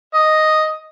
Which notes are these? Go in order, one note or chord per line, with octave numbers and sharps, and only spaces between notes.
D#5